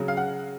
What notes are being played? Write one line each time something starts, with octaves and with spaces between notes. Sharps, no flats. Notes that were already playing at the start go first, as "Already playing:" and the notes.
Already playing: C#3 F#3
F5
F#5